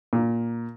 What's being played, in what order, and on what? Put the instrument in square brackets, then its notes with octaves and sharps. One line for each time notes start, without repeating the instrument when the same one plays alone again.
[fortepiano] A#2